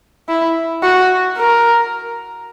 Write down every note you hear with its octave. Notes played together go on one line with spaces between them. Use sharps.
E4
F#4
A#4